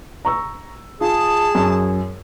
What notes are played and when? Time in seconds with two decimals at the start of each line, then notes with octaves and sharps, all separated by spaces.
0.25 A#5 C#6 E6
1.01 F4 G#4 A5
1.55 F#2